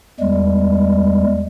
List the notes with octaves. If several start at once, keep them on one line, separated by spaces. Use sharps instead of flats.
E2 G3 G#3